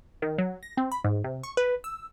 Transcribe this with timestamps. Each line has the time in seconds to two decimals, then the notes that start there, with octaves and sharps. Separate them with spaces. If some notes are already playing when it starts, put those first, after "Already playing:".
0.22 D#3
0.38 F#3
0.63 A#6
0.77 C4
0.92 B5
1.04 G#2
1.24 C3
1.43 C#6
1.57 B4
1.84 E6